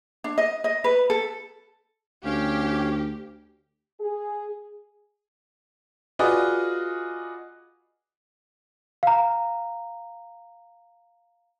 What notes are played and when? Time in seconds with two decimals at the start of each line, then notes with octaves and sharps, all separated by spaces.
0.24 D4
0.38 D#5
0.64 D#5
0.84 B4
1.10 A4
2.25 D2 C#4 G4 F5
3.99 G#4
6.19 F4 F#4 G#4 B4 D5 D#5
9.03 F5 A#5